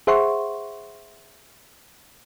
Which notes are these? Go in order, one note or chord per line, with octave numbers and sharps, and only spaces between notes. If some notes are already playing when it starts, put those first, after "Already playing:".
G#4 C5 E5 F#5 C6 C#6